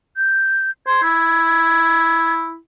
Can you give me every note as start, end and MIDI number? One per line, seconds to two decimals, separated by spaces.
0.17 0.71 91
0.87 0.99 72
0.87 2.33 92
1.03 2.56 64